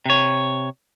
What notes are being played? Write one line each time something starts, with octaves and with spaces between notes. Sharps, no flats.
C3 C#5